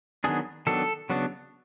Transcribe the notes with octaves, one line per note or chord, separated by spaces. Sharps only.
D#3 F#3 B3 D4 G#4
D#3 F#3 B3 D4 A4
C#3 F#3 B3 D4